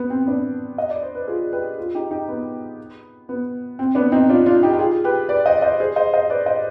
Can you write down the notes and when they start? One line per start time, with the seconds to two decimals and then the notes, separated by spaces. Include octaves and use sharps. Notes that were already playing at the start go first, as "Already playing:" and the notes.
Already playing: B3
0.10 C4
0.26 B3 D4
0.78 D#5
0.90 D5
1.03 C5
1.15 B4
1.28 F4 G#4
1.53 G4 B4
1.78 F4 G#4
1.95 D#4 G4
2.11 D#4 G4
2.28 B3
3.29 B3
3.79 C4
3.95 B3 D4
4.12 C4 D#4
4.29 D4 F4
4.46 D4 F4
4.63 D#4 G4
4.73 G4
4.79 F4 G#4
5.04 G4 B4
5.29 B4 D5
5.46 C5 D#5
5.62 C5 D#5
5.80 G#4 C5
5.96 C5 D#5
6.13 C5 D#5
6.30 B4 D5
6.46 C5 D#5